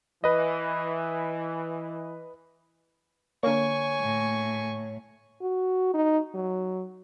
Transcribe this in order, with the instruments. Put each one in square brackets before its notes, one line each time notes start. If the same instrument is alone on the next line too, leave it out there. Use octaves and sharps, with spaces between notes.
[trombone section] E3 [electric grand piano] B4 D#5
[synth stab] D3 A#3 [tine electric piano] C#5 [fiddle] G#5 C#6
[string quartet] A2
[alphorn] F#4
D#4
F#3